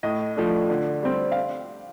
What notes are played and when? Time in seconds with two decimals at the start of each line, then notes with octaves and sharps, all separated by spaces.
0.03 A2 D#5
0.36 F3 A3 D4
0.70 D3
1.03 G3 C4
1.32 F5